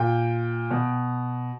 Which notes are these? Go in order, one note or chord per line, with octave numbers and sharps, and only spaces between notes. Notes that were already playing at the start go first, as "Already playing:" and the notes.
Already playing: A#2 G5
B2